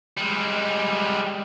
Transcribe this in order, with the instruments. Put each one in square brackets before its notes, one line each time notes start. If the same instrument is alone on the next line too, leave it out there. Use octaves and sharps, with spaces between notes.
[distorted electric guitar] G3 G#3